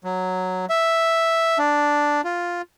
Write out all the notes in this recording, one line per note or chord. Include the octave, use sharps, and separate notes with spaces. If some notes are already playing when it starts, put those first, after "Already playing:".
F#3
E5
D4
F4